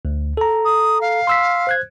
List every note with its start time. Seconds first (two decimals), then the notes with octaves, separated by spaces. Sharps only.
0.05 D2
0.37 A4 A#5
0.65 D#6
1.01 F5
1.27 C6 E6 B6
1.67 C5 F#6 G#6